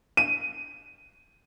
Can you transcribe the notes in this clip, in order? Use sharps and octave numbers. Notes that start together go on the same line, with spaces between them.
D#7